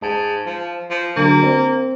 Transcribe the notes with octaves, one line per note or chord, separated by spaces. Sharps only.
G#2 A5
F3
F3
D3 F#3 A#3 G#4
C4